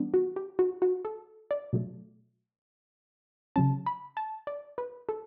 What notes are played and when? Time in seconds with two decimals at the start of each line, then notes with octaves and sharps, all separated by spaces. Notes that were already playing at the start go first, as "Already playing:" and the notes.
Already playing: E3 G3 B3 D4
0.14 F#4
0.36 G4
0.59 F#4
0.82 F#4
1.05 A4
1.51 D5
1.73 B2 F#3 A3
3.56 C#3 F#3 C#4 A5
3.86 B5
4.17 A5
4.47 D5
4.78 B4
5.09 A4